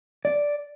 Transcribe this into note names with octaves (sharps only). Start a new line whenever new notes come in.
D5